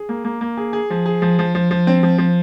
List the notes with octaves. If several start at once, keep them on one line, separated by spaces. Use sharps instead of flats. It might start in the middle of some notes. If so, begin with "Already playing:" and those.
Already playing: G#4
A#3
A#3
A#3
G#4
G#4
F3
G#4
F3
F3
F3
F3
C4
F3
F3